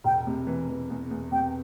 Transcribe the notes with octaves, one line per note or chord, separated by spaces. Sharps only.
E1 G5
C3
E3
E3
E2
E2
C3 G5